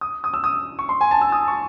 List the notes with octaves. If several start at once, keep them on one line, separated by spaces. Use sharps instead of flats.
D#6
D#6
E6
D#6
C#6
C6
G#5
A5
E6
D#6
C#6